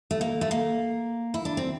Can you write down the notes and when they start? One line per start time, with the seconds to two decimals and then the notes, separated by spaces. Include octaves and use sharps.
0.11 A3
0.21 A#3
0.41 A3
0.51 A#3
1.34 E4
1.45 D4
1.57 C4